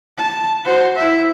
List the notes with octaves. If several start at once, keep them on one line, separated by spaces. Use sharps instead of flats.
A5
F#4 C5
E4 E5